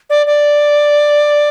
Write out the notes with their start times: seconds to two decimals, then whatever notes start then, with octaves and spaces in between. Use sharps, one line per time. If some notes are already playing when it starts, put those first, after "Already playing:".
0.10 D5
0.27 D5